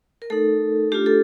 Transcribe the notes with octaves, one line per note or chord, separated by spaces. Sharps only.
A#4
A3 D#4 A4
A3 D4 F4 G4
A4